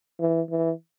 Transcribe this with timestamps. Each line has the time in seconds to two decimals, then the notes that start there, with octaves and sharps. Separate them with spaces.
0.20 E3
0.50 E3